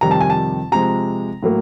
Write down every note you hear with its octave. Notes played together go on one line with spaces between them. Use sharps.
F2 C3 D#3 G3 A#5
A5
G#5
A5
C3 F3 G#3 A#5
A2 F#3 A#3